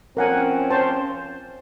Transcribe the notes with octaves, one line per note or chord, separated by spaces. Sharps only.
F3 C4 C#4 A#4 F#5 G#5
C5 A5